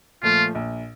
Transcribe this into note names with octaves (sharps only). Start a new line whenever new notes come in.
A#2 F3 A3 F4
A#1